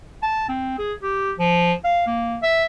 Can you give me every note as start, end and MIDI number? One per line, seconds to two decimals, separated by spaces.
0.23 0.49 81
0.49 0.74 60
0.78 0.93 68
1.02 1.32 67
1.39 1.73 53
1.84 2.05 77
2.07 2.37 58
2.43 2.66 76